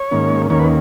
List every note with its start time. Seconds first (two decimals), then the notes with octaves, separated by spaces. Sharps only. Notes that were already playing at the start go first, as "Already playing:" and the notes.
Already playing: C#5
0.11 G#2 D#3 A#3 C#4
0.50 D#2 D#3 A#3 C#4 C#5
0.59 B4